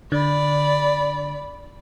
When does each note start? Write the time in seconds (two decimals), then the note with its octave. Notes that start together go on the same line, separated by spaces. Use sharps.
0.12 D3 D5 B5